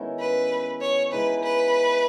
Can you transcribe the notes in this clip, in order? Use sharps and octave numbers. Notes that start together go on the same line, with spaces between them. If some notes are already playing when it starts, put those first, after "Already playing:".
Already playing: D#3 G#3 B3 C#4 E4 F#4
B4
C#5
E3 G#3 D#4 G#4 B4
B4